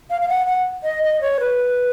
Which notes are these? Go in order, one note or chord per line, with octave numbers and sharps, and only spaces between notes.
F5
F5
F#5
F#5
D#5
D#5
C#5
B4